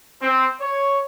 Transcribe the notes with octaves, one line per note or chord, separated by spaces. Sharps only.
C4
C#5